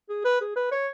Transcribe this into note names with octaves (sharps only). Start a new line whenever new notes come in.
G#4
B4
G#4
B4
C#5